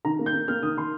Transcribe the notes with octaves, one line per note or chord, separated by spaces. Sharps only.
D#3 A#5
A#3
G6
A#3
A#3 F6
D#3 D#6
D#3 C6